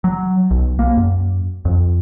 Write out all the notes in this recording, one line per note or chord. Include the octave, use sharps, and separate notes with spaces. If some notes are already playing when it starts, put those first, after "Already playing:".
F#3
B1
A#3
F#2
F2